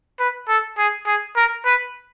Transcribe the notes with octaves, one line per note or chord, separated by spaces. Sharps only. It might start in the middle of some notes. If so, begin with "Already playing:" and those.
B4
A4
G#4
G#4
A#4
B4